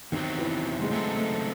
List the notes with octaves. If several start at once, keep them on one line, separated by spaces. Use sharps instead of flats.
E2 C3 D#3 F#3 C4
E3
G#3
C#3 F#3 A3 C4 D#4 A4
A3